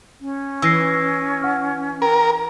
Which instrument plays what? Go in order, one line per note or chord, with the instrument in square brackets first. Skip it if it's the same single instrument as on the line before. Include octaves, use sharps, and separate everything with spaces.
[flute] C#4
[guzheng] E3 [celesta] E6 A#6 C7
[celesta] F#5 F6
[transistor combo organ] A#4 [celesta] G5